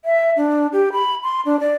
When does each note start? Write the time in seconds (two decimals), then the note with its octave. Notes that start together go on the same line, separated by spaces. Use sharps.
0.05 E5
0.37 D4
0.73 G4
0.93 B5
1.24 C6
1.45 D4
1.60 D5